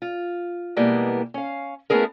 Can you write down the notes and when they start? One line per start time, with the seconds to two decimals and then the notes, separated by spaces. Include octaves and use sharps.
0.02 F4
0.76 B2 E3 G3 G#3 A#3 B3
1.34 C#4 F5
1.90 A3 B3 C#4 E4 G#4 A#4